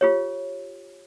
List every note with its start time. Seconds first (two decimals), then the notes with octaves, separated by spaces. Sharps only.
0.01 F4 G4 C#5